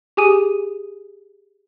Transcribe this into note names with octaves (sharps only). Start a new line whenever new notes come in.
G4 G#4 G#5 D#6 D#7